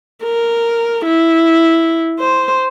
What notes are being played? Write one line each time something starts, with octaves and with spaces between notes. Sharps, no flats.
A#4
E4
C5